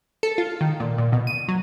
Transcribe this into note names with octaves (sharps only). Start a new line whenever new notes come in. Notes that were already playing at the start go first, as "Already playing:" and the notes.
A4
F4
D#3
A#2
A#2
B2
D#7
F#3